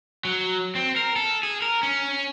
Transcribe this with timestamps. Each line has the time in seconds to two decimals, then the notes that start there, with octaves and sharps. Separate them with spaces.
0.25 F#3
0.75 C4
0.96 A#4
1.16 A4
1.43 G#4
1.62 A#4
1.83 C#4